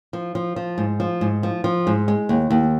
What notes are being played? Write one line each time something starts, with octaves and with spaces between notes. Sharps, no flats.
F3
F3
F3
G#2
F3
G#2
F3
F3
G#2
G#3
D#2
D#2